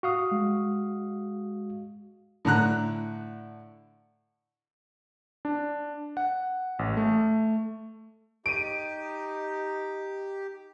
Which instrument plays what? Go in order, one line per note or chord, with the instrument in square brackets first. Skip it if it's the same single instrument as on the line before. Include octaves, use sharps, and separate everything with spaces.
[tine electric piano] F#4 F5 D#6
[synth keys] G#3
[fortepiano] A2 D3 A#5 F#6
[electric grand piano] D4
F#5
A1
A3
[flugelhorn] D#4 [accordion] G4 [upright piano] D7 D#7